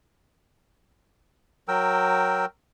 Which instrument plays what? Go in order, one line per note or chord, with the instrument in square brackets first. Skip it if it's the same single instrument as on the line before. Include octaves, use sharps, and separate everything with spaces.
[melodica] F#3 A#4 G5 E6